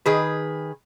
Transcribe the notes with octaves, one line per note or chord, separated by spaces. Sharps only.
D#3 G#4 B4